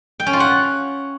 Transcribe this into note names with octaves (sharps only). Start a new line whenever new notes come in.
G5
C#4
F4
F#5